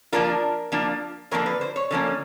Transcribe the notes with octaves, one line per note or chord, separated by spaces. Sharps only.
F3 A#3 D4 F4 A#4
F3 A#3 D4 F4
D3 F3 A#3 C#4 A#4
B4
C5
C#5
D3 F3 A#3 C#4